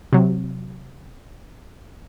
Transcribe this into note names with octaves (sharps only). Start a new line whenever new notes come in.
C3 F#3